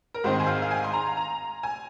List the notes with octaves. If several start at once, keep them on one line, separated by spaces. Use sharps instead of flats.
A#4
G#2 D#3 C4 C5
G#5
F5
F5
G#5
C6
A#5
A#5
G#5